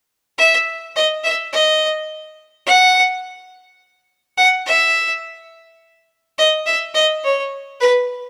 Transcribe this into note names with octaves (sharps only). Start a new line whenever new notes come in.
E5
D#5
E5
D#5
F#5
F#5
E5
D#5
E5
D#5
C#5
B4